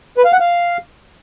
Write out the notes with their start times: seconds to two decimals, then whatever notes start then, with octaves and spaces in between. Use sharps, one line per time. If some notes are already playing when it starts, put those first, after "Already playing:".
0.17 B4
0.25 F5
0.33 F#5
0.40 F5